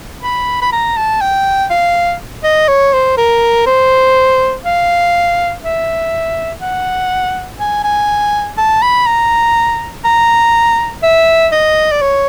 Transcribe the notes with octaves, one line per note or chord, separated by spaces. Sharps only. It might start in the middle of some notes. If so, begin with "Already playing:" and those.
B5
B5
A#5
A5
G5
F5
D#5
C#5
C5
A#4
C5
F5
E5
F#5
G#5
G#5
A5
B5
A#5
A#5
E5
D#5
D5
C#5